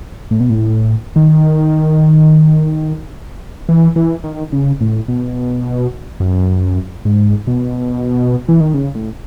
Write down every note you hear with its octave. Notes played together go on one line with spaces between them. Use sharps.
A2
B2
A2
D#3
E3
E3
D#3
C#3
A2
B2
F#2
G#2
B2
E3
D#3
C#3
A2